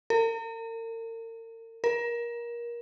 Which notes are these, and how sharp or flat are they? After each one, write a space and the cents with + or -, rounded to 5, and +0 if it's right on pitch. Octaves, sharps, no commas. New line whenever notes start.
A#4 -40
A#4 +25